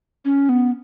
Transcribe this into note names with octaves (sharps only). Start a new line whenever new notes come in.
C#4
B3